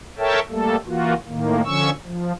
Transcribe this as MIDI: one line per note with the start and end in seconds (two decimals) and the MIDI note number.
0.18 0.40 69
0.18 0.40 70
0.18 0.40 73
0.18 0.40 76
0.18 0.40 79
0.18 0.40 81
0.50 0.76 55
0.50 0.76 57
0.50 0.76 58
0.50 0.76 69
0.86 1.13 52
0.86 1.13 58
0.86 1.13 65
0.86 1.13 66
1.27 1.61 45
1.27 1.61 51
1.27 1.61 58
1.65 1.90 50
1.65 1.90 53
1.65 1.90 61
1.65 1.90 85
1.65 1.90 88
2.04 2.32 53